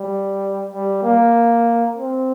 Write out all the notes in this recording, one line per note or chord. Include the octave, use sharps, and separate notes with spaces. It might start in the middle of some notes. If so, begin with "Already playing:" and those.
Already playing: G3
G3
A#3
C4